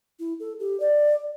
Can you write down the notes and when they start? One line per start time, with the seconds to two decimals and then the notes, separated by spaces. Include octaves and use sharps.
0.19 E4
0.40 A4
0.60 G4
0.80 D5